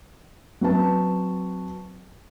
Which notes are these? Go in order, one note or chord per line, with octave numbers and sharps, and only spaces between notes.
F#3 C4 B4 A5